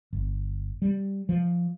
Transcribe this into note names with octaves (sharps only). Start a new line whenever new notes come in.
G1
G3
F3